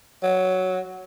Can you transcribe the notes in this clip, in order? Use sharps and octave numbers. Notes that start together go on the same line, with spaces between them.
F#3